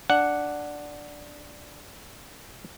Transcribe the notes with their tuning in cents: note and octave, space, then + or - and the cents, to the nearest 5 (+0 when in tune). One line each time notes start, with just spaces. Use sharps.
D4 +0 F#5 +0